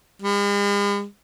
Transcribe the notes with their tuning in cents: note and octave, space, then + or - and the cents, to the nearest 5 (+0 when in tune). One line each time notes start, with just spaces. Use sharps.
G#3 -45